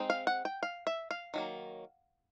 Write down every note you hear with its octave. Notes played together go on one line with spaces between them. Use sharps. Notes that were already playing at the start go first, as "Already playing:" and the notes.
Already playing: G#3 C4 D#4
F5
F#5
G5
F5
E5
F5
D#3 F#3 A#3